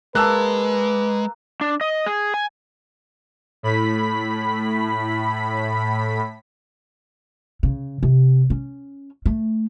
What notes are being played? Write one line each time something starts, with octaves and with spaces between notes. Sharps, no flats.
G#3 A#3 B4 A5 E6 F#6
D4
D#5
G#4
G#5
A2 B5 B6
C#3
C3
C#4
A3